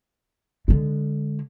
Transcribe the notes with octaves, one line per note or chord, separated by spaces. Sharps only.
D3 G#3